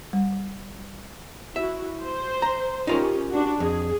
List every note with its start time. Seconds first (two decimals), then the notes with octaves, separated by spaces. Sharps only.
0.13 G3
1.56 E4 F#4 E5
2.02 C5
2.42 A#5
2.87 C#4 D#4 F4 G4 A#4
3.30 D4 F#4
3.60 F2 G#4